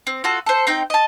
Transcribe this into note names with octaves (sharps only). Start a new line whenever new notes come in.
C4
F4 F#4 A4
A4 C5
C4 D#4 G5
D#5 A5